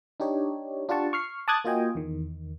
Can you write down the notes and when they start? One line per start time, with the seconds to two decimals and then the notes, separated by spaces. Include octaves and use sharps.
0.20 D4 D#4 G4 C#5
0.89 D4 F4 G4 F#5 A5 C#6
1.13 C#6 F6 C7
1.48 A5 D6 D#6 F#6 G#6 A6
1.64 A#3 F4 F#4 D#5 G5 G#5
1.95 E2 D#3